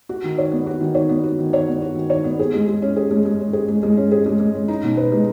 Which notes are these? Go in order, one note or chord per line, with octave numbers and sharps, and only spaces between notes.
F#4
D#3
C#5
B3
F#4
D#3
C#5
B3
F#4
D#3
C#5
B3
F#4
D#3
C#5
B3
G#4
G#3
G#3
C#4
G#4
G#3
G#3
C#4
G#4
G#3
G#3
C#4
G#4
G#3
G#3
C#4
D#4
B2
B4
G#3